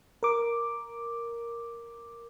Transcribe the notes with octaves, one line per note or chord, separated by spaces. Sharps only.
A#4 D6